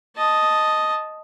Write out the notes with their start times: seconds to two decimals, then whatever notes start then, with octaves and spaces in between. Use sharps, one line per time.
0.16 D#5 A5